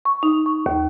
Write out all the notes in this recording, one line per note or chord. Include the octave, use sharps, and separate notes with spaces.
C#6
D#4
C#6
D#2